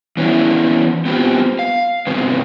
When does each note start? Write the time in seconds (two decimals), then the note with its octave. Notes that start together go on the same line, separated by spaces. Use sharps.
0.17 E3 B3 C#4 D4 E4
1.05 B3 C4 F4 G4
1.59 F5
2.07 G#2 C3 B3